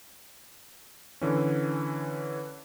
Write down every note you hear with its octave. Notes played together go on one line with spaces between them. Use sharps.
D3 E3 C#4